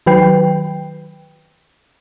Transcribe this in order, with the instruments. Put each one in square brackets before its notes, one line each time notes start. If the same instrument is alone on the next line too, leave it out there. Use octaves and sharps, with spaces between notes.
[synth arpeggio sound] D#3 F#3 B4 G5 C7